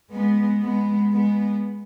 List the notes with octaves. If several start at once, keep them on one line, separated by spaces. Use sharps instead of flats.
G#3 B3
G#3 B3
G#3 B3